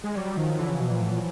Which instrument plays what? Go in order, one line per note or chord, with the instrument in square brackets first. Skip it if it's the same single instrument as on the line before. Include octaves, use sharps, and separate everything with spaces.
[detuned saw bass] G#3
[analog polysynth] F#3 [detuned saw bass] G3
[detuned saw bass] D#3 [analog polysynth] F3
[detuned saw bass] D3 [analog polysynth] E3
[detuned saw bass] C#3
B2
A#2
A2
A#2